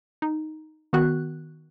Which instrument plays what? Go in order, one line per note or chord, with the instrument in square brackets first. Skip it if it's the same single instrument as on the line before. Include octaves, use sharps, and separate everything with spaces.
[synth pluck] D#4
D#3 B3 F#4 F#6